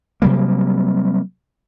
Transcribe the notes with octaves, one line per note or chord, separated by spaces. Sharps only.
C3 F#3 G3 A#3